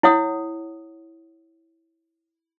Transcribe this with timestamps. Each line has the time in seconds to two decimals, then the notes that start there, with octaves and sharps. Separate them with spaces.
0.03 E4 C#5 F#5 D#6